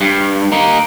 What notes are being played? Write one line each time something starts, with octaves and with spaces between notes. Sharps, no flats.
G2
A#3 D#4